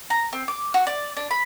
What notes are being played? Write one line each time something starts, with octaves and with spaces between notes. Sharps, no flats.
A#5
C4
D6
F#4
D5
D4
B5